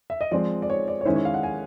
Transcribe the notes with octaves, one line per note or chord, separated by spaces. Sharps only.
E5
D#5
F3 G#3 C4 D5
D5
C#5
D5
C#5
D#3 G#3 C#4 E4 C5
C#5
F5
F#5
G#5